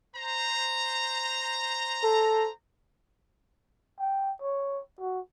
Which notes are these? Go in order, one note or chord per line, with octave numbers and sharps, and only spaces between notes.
C5 A#5
A4
G5
C#5
F#4